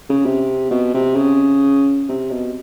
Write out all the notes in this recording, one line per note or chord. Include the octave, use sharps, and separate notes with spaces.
C#3
C3
B2
C3
C#3
C3
B2